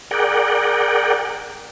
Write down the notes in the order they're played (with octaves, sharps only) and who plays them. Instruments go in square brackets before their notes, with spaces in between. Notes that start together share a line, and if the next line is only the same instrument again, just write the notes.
[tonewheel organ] G#4 A#4 D5 F#5 G5